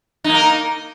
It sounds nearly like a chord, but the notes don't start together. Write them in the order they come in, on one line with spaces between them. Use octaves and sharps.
D#4 A#3 A#4